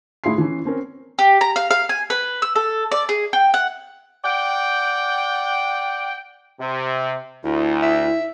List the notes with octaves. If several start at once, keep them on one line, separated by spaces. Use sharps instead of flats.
A2 E4 G#4 C6 C7
E3 C#4
C4 C#4 A#4
G4
A#5
F5
F5
G#5
B4
E6
A4
D5
G#4
G5
F#5
D5 F#5 G5
C3
D2 E4
E5